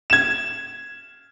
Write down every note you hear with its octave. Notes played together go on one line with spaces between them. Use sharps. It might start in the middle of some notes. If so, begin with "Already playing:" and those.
G#6 E7